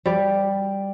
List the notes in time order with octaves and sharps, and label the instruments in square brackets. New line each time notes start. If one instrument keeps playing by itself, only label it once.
[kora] G3 D5